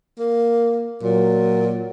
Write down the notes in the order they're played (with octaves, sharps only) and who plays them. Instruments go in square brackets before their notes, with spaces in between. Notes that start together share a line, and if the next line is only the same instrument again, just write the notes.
[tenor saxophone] A#3
[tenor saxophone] A#2 [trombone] F#3